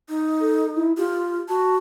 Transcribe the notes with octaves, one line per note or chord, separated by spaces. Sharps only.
D#4
A4
E4
F4 G4
F#4 A5